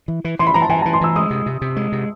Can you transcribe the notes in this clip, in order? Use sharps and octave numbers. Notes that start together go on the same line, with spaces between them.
E3
E3
E3 C6
B5
E3 A#5
A5
E3 G#5
A5
E3
C6
E3 E6
G#3 D#6
C3
C3
C3
G#3
C3